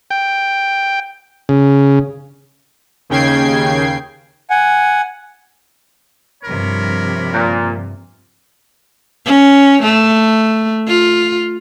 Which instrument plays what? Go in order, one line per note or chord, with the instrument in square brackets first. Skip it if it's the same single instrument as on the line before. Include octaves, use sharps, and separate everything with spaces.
[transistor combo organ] G5
C#3
[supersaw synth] D#2 C#3 G5 G#6 C7
[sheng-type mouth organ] F#5 G#5
[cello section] G2 C3 F3 [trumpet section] A#4 C#5 B5
[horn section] A#2
[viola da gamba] C#4
A3
F4